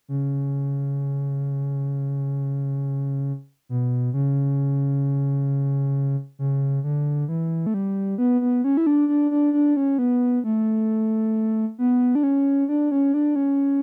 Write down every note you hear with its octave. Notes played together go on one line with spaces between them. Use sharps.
C#3
B2
C#3
C#3
D3
E3
A3
G3
B3
B3
C#4
E4
D4
D4
D4
D4
C#4
B3
A3
B3
D4
C#4
D4
C#4
D4
C#4